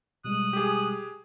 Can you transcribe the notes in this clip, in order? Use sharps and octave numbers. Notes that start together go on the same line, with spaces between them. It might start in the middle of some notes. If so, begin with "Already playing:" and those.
B2 G3 G#3 D#6 F#6
G4 G#4